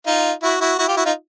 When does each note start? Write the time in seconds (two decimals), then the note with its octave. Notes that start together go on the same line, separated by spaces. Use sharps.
0.07 D#4 F4
0.42 E4 F#4
0.61 E4 F#4
0.79 E4 F#4
0.88 F4 G4
0.97 E4 F#4
1.05 D#4 F4